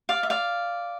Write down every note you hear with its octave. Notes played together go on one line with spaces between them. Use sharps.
D5 F5
E5
D5 F5